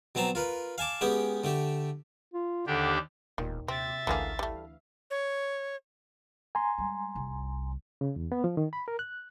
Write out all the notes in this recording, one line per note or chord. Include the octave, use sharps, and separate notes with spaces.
B2 F#3 C4 A5 A#5 C6
F4 A#4 B4
F5 G#5 A5 D6
G#3 B3 C#4 G4 G5
D3 A3 G4
F4
D#2 D3 D4 G4
E1 D#2 A#2 D#3
C3 C4 E5 A6
A1 D2 D3 E3 A#3 G#4 F5
G3 A3
C#5
G#5 A#5 C6
G3 G#3
F1 C2
C#3
E2
B3
F3
D#3
B5
A#4
F#6